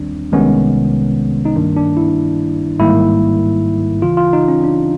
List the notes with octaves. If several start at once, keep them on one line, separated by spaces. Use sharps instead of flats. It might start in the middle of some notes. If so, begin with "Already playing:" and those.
Already playing: D#2 D#3 G3 C4 D4
C2 C3 D#3 G#3 B3 C#4
D#4
G2 D#3 G3 A#3 D4
D4
E4
A1 G#2 D#3 G3 A#3 E4
D2 C#3 E3 F4
F4
D#4
C#4
D4